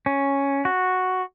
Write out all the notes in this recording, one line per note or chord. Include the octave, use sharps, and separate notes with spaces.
C#4
F#4